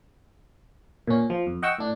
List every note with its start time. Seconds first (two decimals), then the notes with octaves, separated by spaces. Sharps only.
1.07 A#2 C#4
1.30 F3
1.47 F2
1.63 D#5 F#5 G5 C#6 E6
1.78 A2 D4